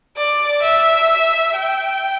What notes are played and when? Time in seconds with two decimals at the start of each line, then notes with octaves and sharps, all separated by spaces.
0.17 D5
0.63 E5
1.55 G5